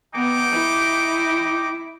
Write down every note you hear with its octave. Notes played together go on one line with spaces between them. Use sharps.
B3 D#4 G5 D6
E4